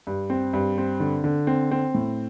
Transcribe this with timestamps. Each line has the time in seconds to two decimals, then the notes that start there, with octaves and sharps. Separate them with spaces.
0.07 G2
0.30 C4
0.53 G2
0.78 C4
1.00 D3
1.24 D3
1.47 C4
1.71 C4
1.95 A2